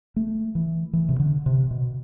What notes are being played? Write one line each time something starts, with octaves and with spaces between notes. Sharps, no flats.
A3
E3
E3
C3
D3
C3
B2